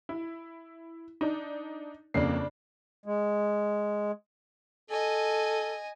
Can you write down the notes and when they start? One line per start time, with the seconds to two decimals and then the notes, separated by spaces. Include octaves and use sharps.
0.09 E4
1.21 D4 D#4
2.14 F2 C#3 A#3 D4 C7
3.06 G#3
4.90 A4 D#5 G#5